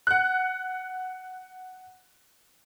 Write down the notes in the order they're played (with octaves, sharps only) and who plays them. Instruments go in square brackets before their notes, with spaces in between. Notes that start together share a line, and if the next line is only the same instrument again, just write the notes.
[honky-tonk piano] F#5 F#6